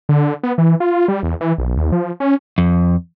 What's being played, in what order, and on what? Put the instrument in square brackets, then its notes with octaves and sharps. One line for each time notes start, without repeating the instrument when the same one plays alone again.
[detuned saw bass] D3
B3
E3
F4
G3
E2
E3
B1
D#2
F3
C#4
[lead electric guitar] F2